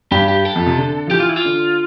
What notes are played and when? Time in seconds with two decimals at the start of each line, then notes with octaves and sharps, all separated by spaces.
0.11 G2 G4
0.28 G4
0.45 A4
0.56 F2
0.67 C3
0.78 D3
1.07 F3
1.11 E3 G4
1.20 F4
1.29 E4
1.36 F4
1.45 D3